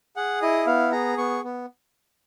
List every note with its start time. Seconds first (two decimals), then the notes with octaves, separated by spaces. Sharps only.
0.16 G#4 F#5
0.42 E4 D#5
0.67 B3 F5
0.92 G#4 A#5
1.18 B3 C#6
1.44 B3